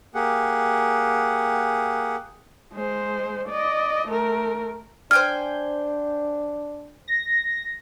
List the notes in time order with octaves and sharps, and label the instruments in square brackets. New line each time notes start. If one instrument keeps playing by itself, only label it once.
[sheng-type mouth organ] A#3 G4 G#4 F#5
[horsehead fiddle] G#3 C5
D5 D#5
A3 A#4
[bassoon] D4 [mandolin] C5 G5 G#5 [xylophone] F6
[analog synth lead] A#6